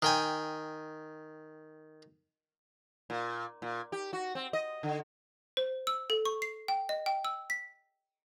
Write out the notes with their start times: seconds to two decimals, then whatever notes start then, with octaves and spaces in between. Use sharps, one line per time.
0.02 D#3 G5 G#5
3.10 A#2
3.62 A#2
3.92 G4
4.13 F#4
4.35 C4
4.53 D#5
4.83 D3
5.57 C5
5.87 E6
6.10 A4
6.25 C#6
6.42 C7
6.68 G5
6.89 D#5
7.06 G5
7.25 E6
7.50 B6